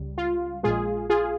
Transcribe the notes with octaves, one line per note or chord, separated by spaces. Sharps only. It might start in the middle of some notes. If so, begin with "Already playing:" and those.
Already playing: C#2 C#3 G3
F4
A#1 A#2 G#3 F4 G#4
F4 G#4